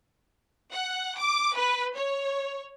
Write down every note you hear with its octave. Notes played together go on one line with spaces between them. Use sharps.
F#5
D6
B4
C#5